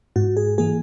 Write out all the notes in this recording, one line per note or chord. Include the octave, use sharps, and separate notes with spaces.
G#2 F#4
G#4
E3 A#3 G#4